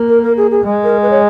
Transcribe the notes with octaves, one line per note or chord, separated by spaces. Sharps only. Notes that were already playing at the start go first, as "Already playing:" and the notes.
Already playing: A#3
A#4
A#4
G#4
G#4
G#3
A#4
B4
C#5